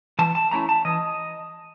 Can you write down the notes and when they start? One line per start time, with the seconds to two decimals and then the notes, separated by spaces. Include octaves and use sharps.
0.19 E3 A5
0.35 A5
0.51 A3 C#4 E4 A#5
0.69 A5
0.85 E3 D#5